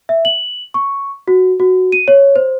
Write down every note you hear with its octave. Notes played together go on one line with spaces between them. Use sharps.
E5
F#7
C#6
F#4
F#4
D#7
C#5
C5